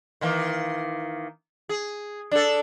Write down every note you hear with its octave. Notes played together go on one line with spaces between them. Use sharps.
D#3 E3 A#3
G#4
D4 A4